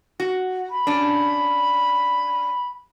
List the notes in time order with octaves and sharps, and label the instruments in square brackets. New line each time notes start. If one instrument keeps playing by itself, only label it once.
[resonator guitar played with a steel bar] F#4
[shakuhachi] B5
[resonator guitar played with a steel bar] C#4 D4